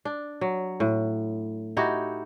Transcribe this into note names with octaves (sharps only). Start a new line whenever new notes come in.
D4
F#3
A2
D#4 E4 F#4 G4